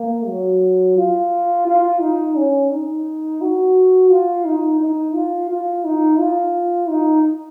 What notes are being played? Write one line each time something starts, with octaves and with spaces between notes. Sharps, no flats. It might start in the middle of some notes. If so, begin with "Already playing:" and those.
Already playing: A#3
F#3
F4
F4
D#4
C#4
D#4
F#4
F4
D#4
D#4
F4
F4
D#4
F4
D#4